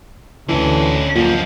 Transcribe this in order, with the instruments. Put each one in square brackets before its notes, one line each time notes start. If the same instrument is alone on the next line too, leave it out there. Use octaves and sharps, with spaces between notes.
[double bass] D2 [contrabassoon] E3 [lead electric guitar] C#4 A4
[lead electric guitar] F#2 F3 [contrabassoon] A#2